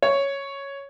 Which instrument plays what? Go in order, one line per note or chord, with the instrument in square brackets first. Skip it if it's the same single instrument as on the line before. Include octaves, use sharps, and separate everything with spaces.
[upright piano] C#5